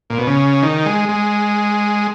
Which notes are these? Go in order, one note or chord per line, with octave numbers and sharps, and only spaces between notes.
A#2
B2
C#3
D#3
G#3
G#3